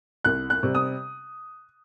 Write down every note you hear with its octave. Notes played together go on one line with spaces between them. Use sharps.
C2 F#6
F#6
C3 G3
D#6